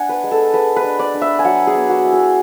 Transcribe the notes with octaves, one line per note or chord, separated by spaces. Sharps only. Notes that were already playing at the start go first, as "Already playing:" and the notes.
Already playing: D4 F#5 G#5
B4
G#3
A4
G#3 B4
B4
D4
D5
D4
E5
G#5
F#3 F#5
G#4
B3
F#4
E4
G#4